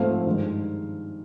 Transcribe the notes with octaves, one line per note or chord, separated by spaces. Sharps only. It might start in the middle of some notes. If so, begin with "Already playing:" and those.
Already playing: G#2 F3 A3 C4 F5
G2 D#3 G#3